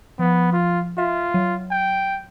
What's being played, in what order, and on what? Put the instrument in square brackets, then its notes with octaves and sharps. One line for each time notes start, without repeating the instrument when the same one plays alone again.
[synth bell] F3 [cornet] B3
[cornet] F4
[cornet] F4 [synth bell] E5
[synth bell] F#3
[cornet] G5